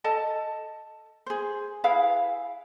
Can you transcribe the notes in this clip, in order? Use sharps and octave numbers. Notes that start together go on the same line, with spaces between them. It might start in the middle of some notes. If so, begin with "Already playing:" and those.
A4 D#5 A5
G#4 C5
E4 G#4 B4 F5